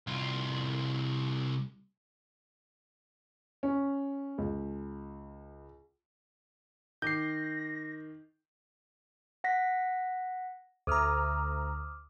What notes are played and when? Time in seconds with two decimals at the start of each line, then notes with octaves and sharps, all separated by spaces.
0.07 C2 F4
3.63 C#4
4.38 C#2
7.02 D#3 D6 G6 A#6 C7
9.44 F#5 A#6 B6
10.87 D2 A#5 D6 D#6 F6